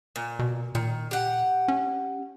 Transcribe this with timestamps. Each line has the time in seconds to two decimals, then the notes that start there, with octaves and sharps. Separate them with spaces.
0.16 A#2
0.39 B2
0.75 A#2 D#3
1.11 G4 F#5
1.68 C#4